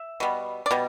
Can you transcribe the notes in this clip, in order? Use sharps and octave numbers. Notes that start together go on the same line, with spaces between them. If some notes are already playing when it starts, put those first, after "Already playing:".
Already playing: E5
B2 G3 B3
D5
B2 G3